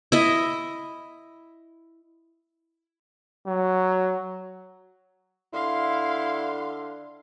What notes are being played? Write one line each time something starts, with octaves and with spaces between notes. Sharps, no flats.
E4 D#5
F#3
D3 E4 F5 C6